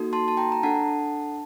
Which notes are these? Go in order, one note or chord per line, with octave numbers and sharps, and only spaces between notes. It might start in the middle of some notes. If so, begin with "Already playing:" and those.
Already playing: A#3 D#4 F#4 A4
A5 C6
A5
G5 A#5
A#5
D4 A4 F#5 A5